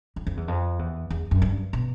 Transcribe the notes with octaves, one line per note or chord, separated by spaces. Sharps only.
F2
F2
E2
F2
E2
E2
F#2
G2
B2